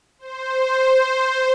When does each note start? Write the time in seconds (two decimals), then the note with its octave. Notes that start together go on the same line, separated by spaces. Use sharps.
0.19 C5